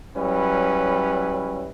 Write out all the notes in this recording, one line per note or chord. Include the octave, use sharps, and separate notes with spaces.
F#3 G3 C#4 E4 B4